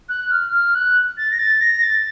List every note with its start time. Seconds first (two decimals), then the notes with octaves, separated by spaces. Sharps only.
0.09 F#6
0.31 F6
0.53 F6
0.75 F#6
1.18 A6
1.31 A#6
1.39 A6
1.61 A#6
1.83 A6